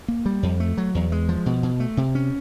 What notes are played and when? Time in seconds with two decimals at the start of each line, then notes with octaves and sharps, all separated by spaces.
0.08 A#3
0.26 G3
0.43 F2
0.60 A3
0.78 F#3
0.95 E2
1.12 G#3
1.29 F3
1.46 B2
1.63 B2
1.80 A3
1.97 C3
2.15 C#4